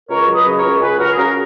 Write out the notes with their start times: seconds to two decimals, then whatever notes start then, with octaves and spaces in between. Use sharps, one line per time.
0.09 C#2 A#4 C#5
0.27 F#3
0.33 B4 D#5
0.45 C#3
0.57 A#4 C#5
0.63 C#2
0.81 C#2 G#4 B4
0.99 F#3 F#4 A#4
1.11 G#4
1.17 C#3 F#4 A#4